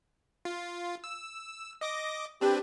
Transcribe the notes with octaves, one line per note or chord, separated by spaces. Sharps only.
F4
E6
D#5 D6 A#6
C4 D4 G4 B4